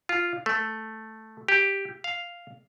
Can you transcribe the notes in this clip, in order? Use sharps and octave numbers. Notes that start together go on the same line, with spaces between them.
F4
A3
G4
F5